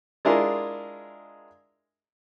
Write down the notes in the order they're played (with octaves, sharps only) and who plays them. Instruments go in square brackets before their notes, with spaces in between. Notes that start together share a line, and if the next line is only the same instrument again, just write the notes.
[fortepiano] G#3 D4 E4 F4 G#4 A#4